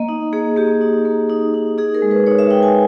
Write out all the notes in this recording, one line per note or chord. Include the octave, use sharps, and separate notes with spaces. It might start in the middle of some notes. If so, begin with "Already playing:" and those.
Already playing: A#3 D#5
D#4
A#3 G#4
A#3 G4
D#4
A#3
D#4
D#4
D#4 G#4
A#4
G#3
B4
D#4 C#5
E5
D#4 G5
G#5